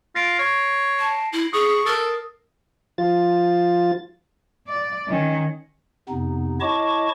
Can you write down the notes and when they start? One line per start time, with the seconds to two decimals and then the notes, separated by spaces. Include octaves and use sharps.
0.15 F4 A#6 C7 D7
0.39 C#5
0.99 A5
1.33 E4
1.53 G#4 C#6 D#6
1.86 A4 A#4
2.98 F3 F4 A6
4.67 D5
5.08 D#3 C#4
6.09 F2 C3 B3 D#4
6.60 E4 C#5 D#5 A5 C#6 D6